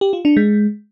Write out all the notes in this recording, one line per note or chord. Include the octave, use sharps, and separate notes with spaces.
G4
F4
D4
G#3